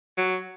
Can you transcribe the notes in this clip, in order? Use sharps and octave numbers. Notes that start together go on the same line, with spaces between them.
F#3